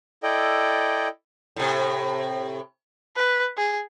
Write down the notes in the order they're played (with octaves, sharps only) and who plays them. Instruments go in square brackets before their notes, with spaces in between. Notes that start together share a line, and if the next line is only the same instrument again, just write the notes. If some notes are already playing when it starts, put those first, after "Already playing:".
[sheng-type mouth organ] E4 A4 D5 D#5 G5
[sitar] A2 C3
[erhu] B4
G#4